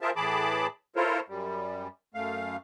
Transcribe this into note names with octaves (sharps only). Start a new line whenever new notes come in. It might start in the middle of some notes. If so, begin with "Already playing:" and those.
F4 G#4 A#4 C5 E5 A5
A2 E3 G#4 A5 B5 D6
E4 F4 A4 A#4 C5 C#5
F#2 G3
F#2 A3 F5